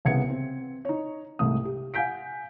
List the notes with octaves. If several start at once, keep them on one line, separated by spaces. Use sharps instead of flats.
C2 C#3 B3 G#6 C#7
C4
D#4 C#5
C2 G#2 A3 D#6
G4
F5 F#5 G#5 G6 B6 D7